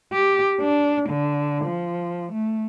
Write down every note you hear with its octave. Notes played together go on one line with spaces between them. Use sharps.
G4
D4
D3
F3
A3